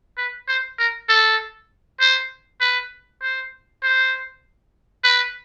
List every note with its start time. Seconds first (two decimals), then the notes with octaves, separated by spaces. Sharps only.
0.17 B4
0.48 C5
0.79 A#4
1.09 A4
2.00 C5
2.60 B4
3.22 C5
3.83 C5
5.04 B4